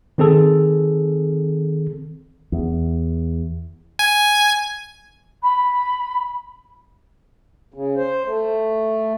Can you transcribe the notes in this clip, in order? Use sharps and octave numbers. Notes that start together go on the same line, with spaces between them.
D#3 C4 G#4 A4
E2
G#5
B5
C#3
C5
A3